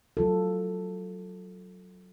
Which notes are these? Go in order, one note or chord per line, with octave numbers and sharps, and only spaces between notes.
F#3 F4 A4